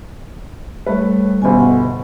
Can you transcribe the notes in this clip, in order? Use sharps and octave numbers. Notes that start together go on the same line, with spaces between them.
G3 A3 B4 C#5
G1 B2 A4 D#5 G#5
F#5